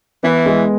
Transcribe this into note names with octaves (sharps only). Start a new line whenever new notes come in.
E3 B3
G#3